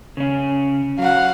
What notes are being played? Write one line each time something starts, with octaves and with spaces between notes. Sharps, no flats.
C#3 C#4
F#3 F5 F#5